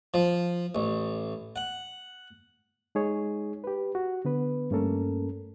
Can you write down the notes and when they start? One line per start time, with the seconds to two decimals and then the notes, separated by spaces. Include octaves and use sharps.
0.14 F3
0.75 A1
1.56 F#5
2.95 G#3 D#4 G#4 C#5
3.64 G4 B4
3.95 F#4
4.25 D3 B3 B4
4.71 G2 A3 A#3 C#4 A4 A#4